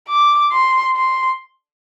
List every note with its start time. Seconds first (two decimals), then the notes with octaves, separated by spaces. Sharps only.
0.09 D6
0.52 C6
0.96 C6